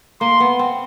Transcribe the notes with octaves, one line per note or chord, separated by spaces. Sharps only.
A#3 C6
B3
C4